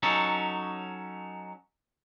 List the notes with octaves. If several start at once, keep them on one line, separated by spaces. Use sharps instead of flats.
F#3 C#4 D#4 A4